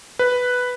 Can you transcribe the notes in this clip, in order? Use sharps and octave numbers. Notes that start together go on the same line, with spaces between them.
B4